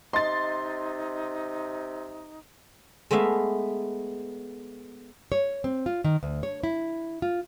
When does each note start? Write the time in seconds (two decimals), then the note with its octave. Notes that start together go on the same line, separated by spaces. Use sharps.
0.13 C3 D#4 D#5 C6 A6
3.11 G#3 A3 B3 E5 F5
5.32 C#5
5.64 C4
5.86 F4
6.04 D#3
6.23 D2
6.43 C#5
6.63 E4
7.22 F4